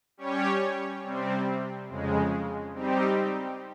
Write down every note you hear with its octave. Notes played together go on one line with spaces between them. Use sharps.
G3 C#4 G4 C#5
C3 G3 C4
F2 C#3 G#3
G3 C4 D#4 G4